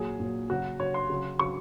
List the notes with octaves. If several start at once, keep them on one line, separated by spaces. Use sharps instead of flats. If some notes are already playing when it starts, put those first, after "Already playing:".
Already playing: A#2 F#3 G#4
A#2 F#3
C#3 F#3 F#4
C#3 F#3 C#5
C6
C#3 F#3
C#3 F#3 C#6